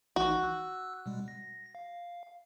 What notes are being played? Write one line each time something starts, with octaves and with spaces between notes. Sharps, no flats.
A#1 E3 D#4 F#4
E6 F#6
B2 G3 G#3
A#6
F5